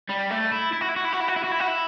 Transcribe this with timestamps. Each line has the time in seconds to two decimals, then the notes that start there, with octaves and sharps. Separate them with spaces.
0.09 G3
0.31 A3
0.52 E4
0.73 E4
0.81 F#4
0.89 E4
0.96 F#4
1.05 E4
1.13 F#4
1.20 E4
1.28 F#4
1.36 E4
1.44 F#4
1.52 E4
1.60 F#4
1.68 E4